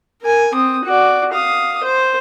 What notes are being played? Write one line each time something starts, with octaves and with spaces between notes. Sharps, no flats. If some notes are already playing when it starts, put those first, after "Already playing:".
A#4 G#5
C4 D#6
F#4 D5
F5 D#6
C5